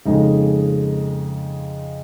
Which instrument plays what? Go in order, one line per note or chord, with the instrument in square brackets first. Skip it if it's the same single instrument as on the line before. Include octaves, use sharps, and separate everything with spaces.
[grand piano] F2 C#3 G#3 D#4